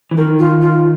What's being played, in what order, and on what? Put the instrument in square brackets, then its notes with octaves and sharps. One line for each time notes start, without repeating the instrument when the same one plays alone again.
[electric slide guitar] E3
[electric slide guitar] D#3 [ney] A#4
[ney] F4
F4